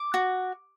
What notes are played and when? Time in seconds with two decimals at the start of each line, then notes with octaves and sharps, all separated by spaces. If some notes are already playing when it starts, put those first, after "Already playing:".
Already playing: D6
0.14 F#4